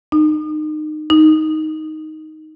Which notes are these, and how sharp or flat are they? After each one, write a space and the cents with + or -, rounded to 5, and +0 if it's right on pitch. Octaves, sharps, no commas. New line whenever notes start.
D#4 -25
D#4 +5